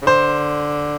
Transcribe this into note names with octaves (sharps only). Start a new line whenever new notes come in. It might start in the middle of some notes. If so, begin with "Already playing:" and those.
C#3
D3 C5